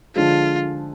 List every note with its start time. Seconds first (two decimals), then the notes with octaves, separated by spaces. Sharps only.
0.15 D3 F3 G#3 F4